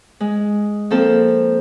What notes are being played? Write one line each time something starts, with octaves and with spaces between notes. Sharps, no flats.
G#3
F3 A#3 C4 A4